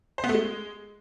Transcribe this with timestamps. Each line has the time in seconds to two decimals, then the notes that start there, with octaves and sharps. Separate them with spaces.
0.18 C5
0.24 B3
0.29 A3
0.34 G#3